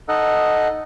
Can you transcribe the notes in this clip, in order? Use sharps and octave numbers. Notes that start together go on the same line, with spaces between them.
D#4 A4 D#5 F#5